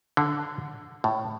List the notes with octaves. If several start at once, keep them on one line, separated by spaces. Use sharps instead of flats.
D3
A2